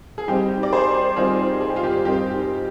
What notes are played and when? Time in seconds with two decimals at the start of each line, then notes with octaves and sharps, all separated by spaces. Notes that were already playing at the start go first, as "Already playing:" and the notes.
0.18 G#4
0.28 G3 C4 D#4 G4
0.63 D5
0.72 G#4 C5
1.16 G3 C4 D#4 F4 G#4
1.61 G#4
1.69 G4
1.76 F4
1.83 G4
2.05 G3 C4 D#4 G4